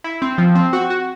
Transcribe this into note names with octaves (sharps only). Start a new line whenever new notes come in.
E4
C4
F3
C4
F#4
F#4